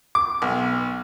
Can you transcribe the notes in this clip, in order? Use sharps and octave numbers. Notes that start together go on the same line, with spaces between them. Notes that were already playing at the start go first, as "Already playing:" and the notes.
D6
B1